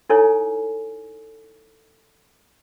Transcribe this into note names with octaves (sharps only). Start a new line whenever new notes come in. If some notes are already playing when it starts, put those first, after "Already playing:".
D#4 E4 A4 C#5 G#5